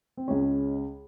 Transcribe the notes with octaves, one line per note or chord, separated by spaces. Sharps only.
C4
C#2 C#3 G#3 C#4